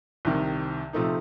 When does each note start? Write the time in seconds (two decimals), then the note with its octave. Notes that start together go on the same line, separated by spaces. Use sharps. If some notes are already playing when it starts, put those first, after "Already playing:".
0.25 C2 C3 D#3
0.93 C3 F3 A3 D#4